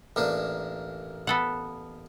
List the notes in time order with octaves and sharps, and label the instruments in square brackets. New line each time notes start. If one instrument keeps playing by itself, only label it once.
[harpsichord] A1 A#3 D4
[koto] B3 A4 F#5